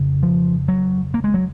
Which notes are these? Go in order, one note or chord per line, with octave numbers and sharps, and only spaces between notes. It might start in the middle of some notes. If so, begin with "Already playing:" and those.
Already playing: F2 C#3
F3
F#3
A#3
G#3
F#3